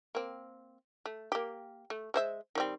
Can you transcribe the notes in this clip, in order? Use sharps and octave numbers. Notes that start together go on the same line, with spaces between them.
A#3 C4
A3
A#3 G4
A3
G#3 C5 E5
D#3 G3 C4